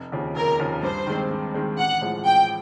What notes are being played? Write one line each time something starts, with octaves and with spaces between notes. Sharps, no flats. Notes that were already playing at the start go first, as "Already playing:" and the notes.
Already playing: F1
D#2 C#3 F3
F1 A#4
D#2 C#3 F3
G2 C5
D#3 G#3 C4
G2
D#3 G#3 C4
A1 F#5
A2 F3 G#3
A1 G5